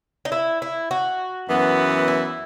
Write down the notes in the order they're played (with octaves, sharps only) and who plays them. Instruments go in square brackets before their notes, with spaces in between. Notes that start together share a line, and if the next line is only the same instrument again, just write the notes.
[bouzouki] D#4
E4
E4
F#4
[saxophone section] F#2 E3 B3
[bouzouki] E4